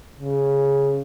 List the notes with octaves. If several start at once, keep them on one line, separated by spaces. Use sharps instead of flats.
C#3